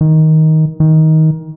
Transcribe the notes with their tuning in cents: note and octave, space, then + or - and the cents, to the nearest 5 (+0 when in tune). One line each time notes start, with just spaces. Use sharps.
D#3 +15
D#3 +20